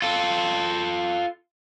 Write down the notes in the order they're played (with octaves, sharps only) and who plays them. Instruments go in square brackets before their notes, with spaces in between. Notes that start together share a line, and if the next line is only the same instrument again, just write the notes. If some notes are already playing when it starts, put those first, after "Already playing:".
[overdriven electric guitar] F4 A4